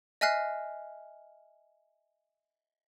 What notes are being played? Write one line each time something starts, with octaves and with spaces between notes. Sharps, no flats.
D#5 E5 G#5 F6 F#6 C7